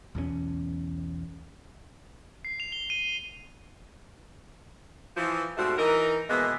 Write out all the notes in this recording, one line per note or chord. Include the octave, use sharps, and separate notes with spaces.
B1 E2 D#3 C#4
C7
F7
G7
D#7
E3 F3
G#2 B2 G3 A3 C4 F#4
E3 D#4 A#4
B2 E3 F3 G#3 A#3 B3